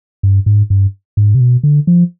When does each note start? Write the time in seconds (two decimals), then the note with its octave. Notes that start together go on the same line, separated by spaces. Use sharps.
0.23 G2
0.46 G#2
0.70 G2
1.17 G#2
1.35 C3
1.40 B2
1.63 D3
1.87 F3